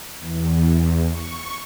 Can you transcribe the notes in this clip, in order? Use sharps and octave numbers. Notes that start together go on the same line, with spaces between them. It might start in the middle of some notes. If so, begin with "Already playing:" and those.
E2
C#6